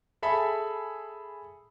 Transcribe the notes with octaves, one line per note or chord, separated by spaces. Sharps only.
G#4 A4 E5 B5